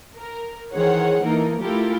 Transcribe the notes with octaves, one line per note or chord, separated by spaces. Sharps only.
A#4
D#3 E3 G#4 C5 C#5 F#5
E3 A#3 D#4 A4 A#4
A3 E4 F4 G4 A4 A#4